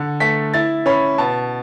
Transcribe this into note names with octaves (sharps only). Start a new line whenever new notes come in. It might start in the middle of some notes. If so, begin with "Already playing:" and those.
Already playing: D3
A3 B6
E4 A6
C#4 B5
B2 A5